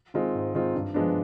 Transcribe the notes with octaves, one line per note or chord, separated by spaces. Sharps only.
D#3 G#3 C4 F4
G#2
D#3 G#3 C4 F4
G2
F3 G#3 B3 D4